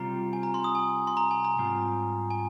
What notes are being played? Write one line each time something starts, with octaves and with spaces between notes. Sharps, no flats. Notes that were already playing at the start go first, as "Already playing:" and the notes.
Already playing: C3 G3 C4 F4 A#5
G#5
A#5
C6
D#6
G#5
C6
A#5
G#5
A#5
G#2 G3 C4 F4
G#5